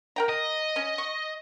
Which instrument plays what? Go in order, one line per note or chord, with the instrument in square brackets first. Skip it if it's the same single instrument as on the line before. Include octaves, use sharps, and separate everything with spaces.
[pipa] A#4 G5 A#5
[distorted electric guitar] D#5
[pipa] C#4
C#6